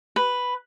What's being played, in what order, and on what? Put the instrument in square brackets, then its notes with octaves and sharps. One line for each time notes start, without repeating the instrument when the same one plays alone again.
[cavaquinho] B4